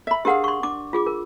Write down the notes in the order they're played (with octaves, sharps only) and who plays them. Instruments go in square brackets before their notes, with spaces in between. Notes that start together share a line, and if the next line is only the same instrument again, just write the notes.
[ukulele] E5 B5
[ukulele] D4 G#4 F5 [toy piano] G4 A#4 F#5
[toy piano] C6 C#6
[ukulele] D4 [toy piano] D6
[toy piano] F4 G#4 D6
A#4